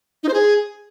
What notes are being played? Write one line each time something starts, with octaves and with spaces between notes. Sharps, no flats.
D#4
C5
G#4